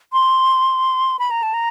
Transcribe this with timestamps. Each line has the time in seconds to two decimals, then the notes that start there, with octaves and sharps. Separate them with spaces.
0.13 C6
1.19 B5
1.31 A#5
1.43 A5
1.54 A#5